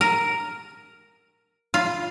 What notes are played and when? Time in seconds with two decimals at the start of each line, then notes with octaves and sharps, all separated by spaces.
0.01 A#4
1.74 F4